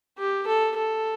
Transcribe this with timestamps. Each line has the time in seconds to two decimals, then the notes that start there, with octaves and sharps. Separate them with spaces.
0.18 G4
0.47 A4
0.77 A4